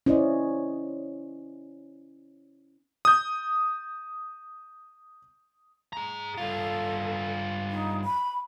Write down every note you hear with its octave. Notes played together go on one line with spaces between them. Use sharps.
C#4 E4 C5 D5 D#5
D#6 G6
G#4 A#5
G2 F4 A4
D#4
B5